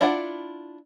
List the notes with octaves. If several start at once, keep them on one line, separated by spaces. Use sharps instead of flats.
D4 E4 F4 D5 F#5